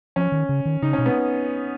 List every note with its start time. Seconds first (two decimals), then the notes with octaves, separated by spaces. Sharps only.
0.16 F3 C#4
0.32 D#3
0.49 C#3
0.66 D#3
0.82 C#3 D#4
0.93 C#4
0.98 B2
1.06 B3